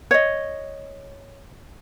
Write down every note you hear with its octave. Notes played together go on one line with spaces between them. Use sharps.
C#5 D#5